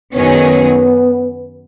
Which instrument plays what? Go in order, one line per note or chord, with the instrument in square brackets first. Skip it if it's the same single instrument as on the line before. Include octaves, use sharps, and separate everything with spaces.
[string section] F#2 D#3 F#3 C#4 G#4 [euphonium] B3